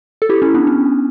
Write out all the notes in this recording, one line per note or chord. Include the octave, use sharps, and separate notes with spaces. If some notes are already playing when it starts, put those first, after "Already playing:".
A4
E4 G4
C#4 E4
B3 D4
C#4